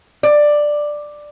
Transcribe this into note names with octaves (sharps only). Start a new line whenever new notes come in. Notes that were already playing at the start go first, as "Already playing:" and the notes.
D5